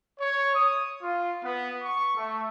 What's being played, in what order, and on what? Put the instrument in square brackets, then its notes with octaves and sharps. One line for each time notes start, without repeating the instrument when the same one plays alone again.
[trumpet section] C#5
D#6
F4
B3
C#6
A3